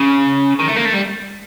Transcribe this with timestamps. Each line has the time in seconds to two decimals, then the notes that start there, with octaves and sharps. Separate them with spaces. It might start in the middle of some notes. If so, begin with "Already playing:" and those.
Already playing: C#3
0.59 D#3
0.68 A3
0.76 A#3
0.85 A3
0.93 G3